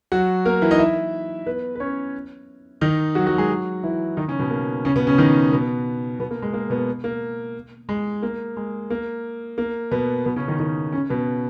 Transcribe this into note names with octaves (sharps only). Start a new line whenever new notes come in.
F#3 F#4
A#3 A#4
E3 E4
D#4 D#5
E4 E5
B3 B4
B4
C#4 C#5
D#3 D#4
F#3 F#4
F#3 F#4
G#3 G#4
F#3 F#4
E3 E4
D#3 D#4
C#3 C#4
B2 B3
A#3
C#3 C#4
B2 B3
C#3 C#4
D#3 D#4
B2 B3
B2 B3
A#3
G#3
A#3
B2 B3
A#3
G#3
A#3
G#3
A#3
A#3
B2 B3
B2 B3
C#3 C#4
D#3 D#4
D#3 D#4
C#3 C#4
B2 B3